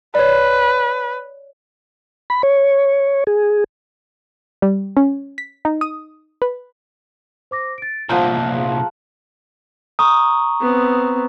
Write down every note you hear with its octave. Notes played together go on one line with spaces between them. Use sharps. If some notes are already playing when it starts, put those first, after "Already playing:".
B4 C#5 D5
B5
C#5
G#4
G3
C#4
B6
D#4
D#6
B4
C5 D6 A#6
A6 D7
C2 A#2 F3 F#5 A#5 F6 G6
G#4 F5
A#5 C#6 D#6
B3 C4